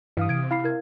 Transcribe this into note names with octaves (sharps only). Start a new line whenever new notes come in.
G2 E3 F5 D#6
C3 G#6 D7
E4 F5 B5 C7
E4 A#4 G#6